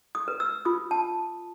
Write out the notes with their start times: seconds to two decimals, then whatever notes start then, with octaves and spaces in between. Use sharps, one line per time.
0.15 D#6
0.28 B4
0.40 E6
0.65 F4 D#6
0.91 A5